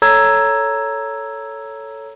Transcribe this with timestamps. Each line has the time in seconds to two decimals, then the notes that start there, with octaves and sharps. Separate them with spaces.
0.02 A4 C#5 A#5 E6 G#6